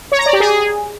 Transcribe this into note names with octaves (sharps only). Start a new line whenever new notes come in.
C#5
A#5
D5
G4
G#4